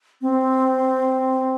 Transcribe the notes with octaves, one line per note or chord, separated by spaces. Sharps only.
C4